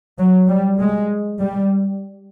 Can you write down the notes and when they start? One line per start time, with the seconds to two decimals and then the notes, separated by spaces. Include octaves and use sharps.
0.18 F#3
0.48 G3
0.79 G#3
1.40 G3